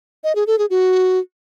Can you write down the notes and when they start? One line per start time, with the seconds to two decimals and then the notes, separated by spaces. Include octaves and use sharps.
0.24 D#5
0.35 G#4
0.47 A4
0.59 G#4
0.70 F#4